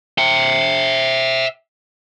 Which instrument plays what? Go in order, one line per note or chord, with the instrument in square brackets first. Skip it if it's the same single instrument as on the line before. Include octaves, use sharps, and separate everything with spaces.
[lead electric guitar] E5 G5